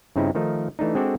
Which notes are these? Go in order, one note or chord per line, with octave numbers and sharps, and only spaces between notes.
G2 C#3 C4 D#4 E4
D#3 F3 A3 D#4
E3 A3 D4 D#4
G#3 C4 D4 F#4 A4 D5